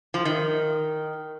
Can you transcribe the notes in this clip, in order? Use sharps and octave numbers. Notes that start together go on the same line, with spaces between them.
F3
D#3